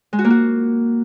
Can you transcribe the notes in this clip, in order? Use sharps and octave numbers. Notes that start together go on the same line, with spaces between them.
G#3
F#4
A#3
F#4